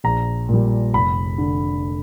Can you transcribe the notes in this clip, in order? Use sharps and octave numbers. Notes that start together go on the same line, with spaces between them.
A#1 A#5
A#2 G3
F1 B5
D3